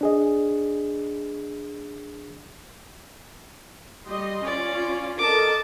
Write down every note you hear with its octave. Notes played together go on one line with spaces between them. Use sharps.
D4 G#4 D#5
G3 D#5 C6
C#4 F4 D5
A4 A#4 D#5 A5 D6